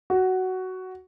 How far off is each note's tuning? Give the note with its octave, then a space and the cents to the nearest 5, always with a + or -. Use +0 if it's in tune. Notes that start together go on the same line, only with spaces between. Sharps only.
F#4 +10